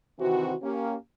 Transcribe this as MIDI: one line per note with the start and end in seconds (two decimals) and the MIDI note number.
0.19 0.54 48
0.19 0.54 51
0.19 0.54 52
0.19 0.54 60
0.19 0.54 66
0.62 0.95 58
0.62 0.95 61
0.62 0.95 67